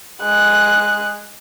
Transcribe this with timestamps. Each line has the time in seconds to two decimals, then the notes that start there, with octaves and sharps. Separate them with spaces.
0.23 G#3 F#6